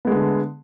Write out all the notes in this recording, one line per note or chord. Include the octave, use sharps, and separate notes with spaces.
D3 G#3 A3 B3